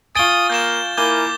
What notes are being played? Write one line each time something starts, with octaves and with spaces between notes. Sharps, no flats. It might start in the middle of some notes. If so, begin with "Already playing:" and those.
F4 G#5 C#6 D#6 A6 D7 G7
A#3 G6 E7
A#3 E4 A#4 G#5 D6 G6 G7